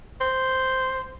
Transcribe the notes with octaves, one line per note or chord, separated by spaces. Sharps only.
C5